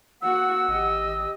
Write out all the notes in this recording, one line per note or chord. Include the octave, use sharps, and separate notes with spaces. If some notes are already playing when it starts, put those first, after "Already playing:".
A#3 F#4 F#5 E6
G#1 G4 D#5